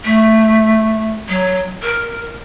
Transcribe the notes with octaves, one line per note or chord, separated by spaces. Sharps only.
A3
F#3
A#4